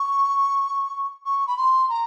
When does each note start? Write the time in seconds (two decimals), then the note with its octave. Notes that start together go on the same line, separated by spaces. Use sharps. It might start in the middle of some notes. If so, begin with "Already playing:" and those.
Already playing: C#6
1.25 C#6
1.47 B5
1.57 C6
1.89 A#5